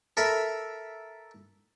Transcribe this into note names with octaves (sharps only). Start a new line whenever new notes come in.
A4 A#4 E5 B5